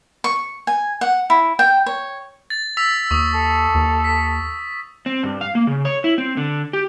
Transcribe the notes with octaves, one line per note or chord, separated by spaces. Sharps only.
C#6
G#5
F#5
E4
G5
C#5
A6
E6 B6 F7
D#2 C#6 D#6
A4
D#2
B6
C4
G2
F5
A#3
C#3
C#5
E4
C4
D3
G4